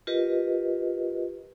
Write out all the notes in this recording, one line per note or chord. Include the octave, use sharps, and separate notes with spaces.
F4 G4 A#4 B4 D#5